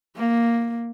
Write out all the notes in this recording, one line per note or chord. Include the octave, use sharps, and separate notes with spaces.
A#3